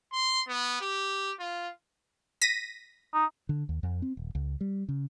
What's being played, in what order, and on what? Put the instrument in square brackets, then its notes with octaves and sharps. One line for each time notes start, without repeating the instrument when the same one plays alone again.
[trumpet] C6
B3
G4
F4
[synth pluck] A#6 B6 D#7
[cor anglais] D#4
[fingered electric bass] D3
D#2
F2
C4
D#1
C#2
G3
C#3